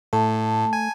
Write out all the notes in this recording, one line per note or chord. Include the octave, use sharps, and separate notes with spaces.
A2 A3 A5
G#5